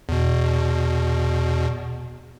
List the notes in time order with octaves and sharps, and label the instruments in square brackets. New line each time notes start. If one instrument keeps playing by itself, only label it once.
[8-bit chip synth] E2 B2